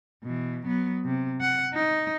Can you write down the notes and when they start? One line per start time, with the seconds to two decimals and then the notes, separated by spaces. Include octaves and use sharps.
0.23 B2 E3
0.65 F#3 B3
1.05 C3
1.41 F#5
1.74 D#4